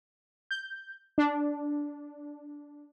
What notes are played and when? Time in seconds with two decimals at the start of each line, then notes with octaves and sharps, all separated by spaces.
0.51 G6
1.18 D4